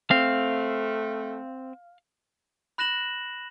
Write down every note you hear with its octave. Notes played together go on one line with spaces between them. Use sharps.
A3 C4 F5
B5 F#6 A#6 E7 F#7